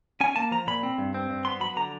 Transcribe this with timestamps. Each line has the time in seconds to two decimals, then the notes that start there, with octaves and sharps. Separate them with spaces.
0.21 C#4 G#5
0.36 A#3 A5
0.51 F3 A#5
0.67 A#2 B5
0.83 C4
0.98 G2
1.14 C4
1.30 G2
1.45 B3 C6
1.60 F#3 B5
1.76 D3 A#5